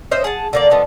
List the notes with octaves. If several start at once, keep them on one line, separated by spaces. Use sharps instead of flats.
C#4 C5 D#5 E5
G#4 F#5 A5
D3 A#3 D5
F3 B3 A4 D#5